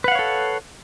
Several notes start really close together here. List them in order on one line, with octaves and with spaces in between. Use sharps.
B4 F#5 F5 C#5 A4